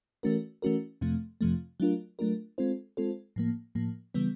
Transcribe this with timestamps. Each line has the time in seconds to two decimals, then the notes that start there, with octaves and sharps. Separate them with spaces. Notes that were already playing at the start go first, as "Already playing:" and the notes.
0.23 E3 A3 C#4 F#4 A#4
0.62 E3 A3 C#4 F#4 A#4
1.01 F2 C3 F3 A3
1.41 F2 C3 F3 A3
1.80 F#3 A3 D4 F4 A#4
2.19 F#3 A3 D4 F4 A#4
2.58 G#3 C4 F4 A4 C5
2.97 G#3 C4 F4 A4 C5
3.36 A2 F3 A#3
3.75 A2 F3 A#3
4.14 C#3 E3 G3 B3